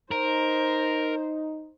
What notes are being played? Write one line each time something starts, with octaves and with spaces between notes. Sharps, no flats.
D#4 A#4 C5